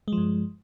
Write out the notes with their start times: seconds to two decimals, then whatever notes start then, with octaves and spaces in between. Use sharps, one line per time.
0.08 G#3
0.13 F3
0.17 G2